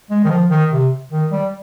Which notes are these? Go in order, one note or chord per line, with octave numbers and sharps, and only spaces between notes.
G#3
D#3
F3
D#3
C3
D#3
G3